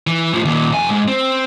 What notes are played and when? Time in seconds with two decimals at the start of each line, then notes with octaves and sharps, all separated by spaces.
0.07 E3
0.33 A2 F3
0.45 D#2 A#2
0.73 F2 G#5
0.91 G#2
1.08 C4